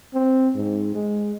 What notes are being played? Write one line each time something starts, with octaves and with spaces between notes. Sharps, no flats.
C4
G#2
G#3